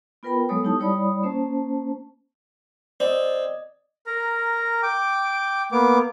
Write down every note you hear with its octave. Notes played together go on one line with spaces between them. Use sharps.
B3 F4 A#4 B4 G5 B5
F#3 G#3 B3 A4 C#5 D#6
D#4 E4 G4 A5 D#6
G3 E4 C#5 D5 B5 D#6
A#3 C#4 C5 A5
C4 D5 D#5
A#4 A#5
G5 D6
A#3 B3 D6